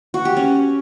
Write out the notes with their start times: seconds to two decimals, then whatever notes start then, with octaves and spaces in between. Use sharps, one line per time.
0.14 F#4
0.25 G4
0.37 C#4